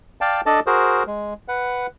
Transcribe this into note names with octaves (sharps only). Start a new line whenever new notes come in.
D5 F5 G5 A5
D4 A4 D5 D#5 A5
F#4 G#4 A#4 C5
G#3
B4 F#5